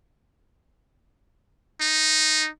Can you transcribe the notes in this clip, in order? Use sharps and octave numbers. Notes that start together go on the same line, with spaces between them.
D#4